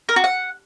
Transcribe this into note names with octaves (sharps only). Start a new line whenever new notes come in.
A#4
F#4
F#5